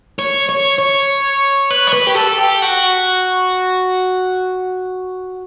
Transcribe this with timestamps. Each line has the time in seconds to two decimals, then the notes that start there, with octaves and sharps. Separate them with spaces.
0.19 C#5
0.49 C#5
0.78 C#5
1.70 B4
1.87 C#5
1.93 B4
2.07 G4
2.15 A4
2.38 G4
2.62 F#4